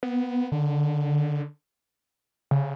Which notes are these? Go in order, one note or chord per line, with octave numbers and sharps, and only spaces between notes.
B3
D3
C#3